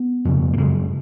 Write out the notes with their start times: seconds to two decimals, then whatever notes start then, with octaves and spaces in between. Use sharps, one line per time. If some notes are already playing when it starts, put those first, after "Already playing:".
Already playing: B3
0.25 F2 C#3
0.53 A#3
0.57 F#2 C#3 G#3